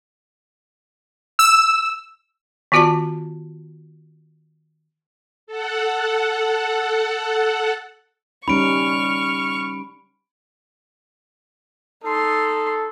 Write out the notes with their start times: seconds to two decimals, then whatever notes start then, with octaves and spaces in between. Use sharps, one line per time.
1.39 E6
2.72 D#3 B3 F4 F#4 D5 A5
5.47 A4 F#5
8.48 G3 C#4 D#4 B5 C#6 F6 D7
12.04 D#4 A4 C6